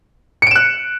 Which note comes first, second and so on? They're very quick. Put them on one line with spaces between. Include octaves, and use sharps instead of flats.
C#7 D7 E7 F#6